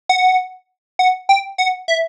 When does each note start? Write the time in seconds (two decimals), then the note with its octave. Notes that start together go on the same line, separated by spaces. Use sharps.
0.09 F#5
0.99 F#5
1.29 G5
1.58 F#5
1.88 E5